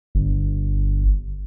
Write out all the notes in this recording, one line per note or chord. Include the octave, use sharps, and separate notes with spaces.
G1